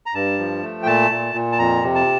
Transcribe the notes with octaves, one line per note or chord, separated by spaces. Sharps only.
A#5
G2 A5
F3
A3
G5
A#2 A5
A#2
A#2
A5
F2 A#5
C3
A5